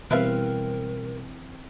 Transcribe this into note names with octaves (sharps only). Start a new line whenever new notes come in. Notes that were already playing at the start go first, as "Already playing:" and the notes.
B2 E3 G3 C4 A#4 B4 E5 F5